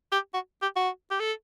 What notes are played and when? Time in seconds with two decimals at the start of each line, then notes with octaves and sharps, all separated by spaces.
0.12 G4
0.34 F#4
0.62 G4
0.76 F#4
1.11 G4
1.19 A4